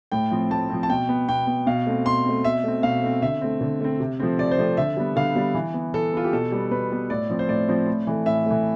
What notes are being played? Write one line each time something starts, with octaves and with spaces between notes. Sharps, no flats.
A2 G5
F3 C4
A2 A5
F3 C4
A5
B2 G5
B3
B2 G5
B3
B2 F5
A3 C4
B2 C6
A3 C4
B2 E5
A3 C4
B2 F5
A3 C4
D3 E5
A3 C4
D3
A3 C4
C3
F3 A3 C4
C3 D5
C5
F3 A3 C4
D3 E5
G3 B3
D3 F5
G3 B3
E3
B3
E3 A4
B3 F4
G4
B2 A4
G3 B3
B2 B4
G3 B3
A2 D5
F3 C4
C5
A2 D5
F3 C4
A2
E3 A3
A2 E5
E3 A3